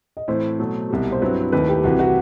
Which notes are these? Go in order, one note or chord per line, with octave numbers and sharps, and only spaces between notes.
D#5
A2 E3 A3 C4 E4 C5
B2 F#3 A3
C2 B2 G3
C5
G2 F#3 C4 E4 B4
D#2 D#3 A3 E4 B4
G4
C2 C3 E3 F#4
F#4